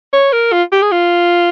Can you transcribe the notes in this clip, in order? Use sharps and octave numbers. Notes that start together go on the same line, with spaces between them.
C#5
A#4
F4
G4
G#4
F4